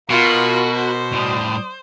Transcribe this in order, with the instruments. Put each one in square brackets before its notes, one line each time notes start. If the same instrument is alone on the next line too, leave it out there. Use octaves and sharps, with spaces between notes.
[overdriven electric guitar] B2 [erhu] F4 [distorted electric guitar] F#4 [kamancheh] A#4 B5
[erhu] C5
[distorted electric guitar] A2 G3 [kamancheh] D5 D#6